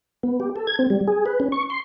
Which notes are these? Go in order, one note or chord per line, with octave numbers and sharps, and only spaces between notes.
B3
G4
A4
G#6
C4
G3
G#4
B4
C#4
C#6
C6